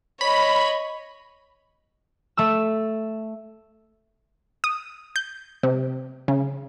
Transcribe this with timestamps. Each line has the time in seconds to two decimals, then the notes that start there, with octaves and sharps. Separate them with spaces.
0.21 C#5 D#5 B5
2.37 A3 E6
4.64 D#6
5.16 G6
5.63 C3
6.28 C#3